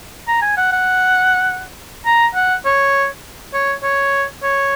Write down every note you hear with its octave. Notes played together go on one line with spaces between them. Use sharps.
A#5
G#5
F#5
F#5
A#5
F#5
C#5
C#5
C#5
C#5